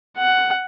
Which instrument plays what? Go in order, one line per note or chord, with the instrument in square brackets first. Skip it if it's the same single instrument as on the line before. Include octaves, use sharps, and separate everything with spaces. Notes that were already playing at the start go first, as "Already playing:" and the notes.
[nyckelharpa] F#5